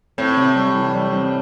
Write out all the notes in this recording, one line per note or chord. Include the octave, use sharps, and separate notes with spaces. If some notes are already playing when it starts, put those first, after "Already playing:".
A2 C4
C3
G3
E3
G3
C4